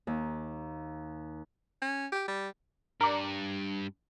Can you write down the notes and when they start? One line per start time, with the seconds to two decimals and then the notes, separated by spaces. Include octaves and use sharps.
0.07 D#2
1.82 C#4
2.12 G4
2.28 G3
3.01 G2 A#4 D5